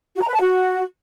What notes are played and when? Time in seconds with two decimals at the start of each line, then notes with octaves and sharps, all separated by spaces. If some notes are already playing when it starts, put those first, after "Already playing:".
0.16 F#4
0.22 A#5
0.28 B4
0.34 A5
0.40 F#4